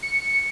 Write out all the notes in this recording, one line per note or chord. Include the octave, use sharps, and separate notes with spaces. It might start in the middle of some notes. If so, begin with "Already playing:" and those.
C#7